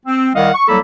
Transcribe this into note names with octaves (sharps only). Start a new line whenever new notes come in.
C4
C2 D#3 D#5 F5 F#5
C#6
C2 F#3 A#3 A4 B5